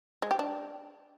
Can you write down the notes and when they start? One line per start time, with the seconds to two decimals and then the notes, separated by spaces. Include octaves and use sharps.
0.22 G#3
0.31 G4
0.39 D4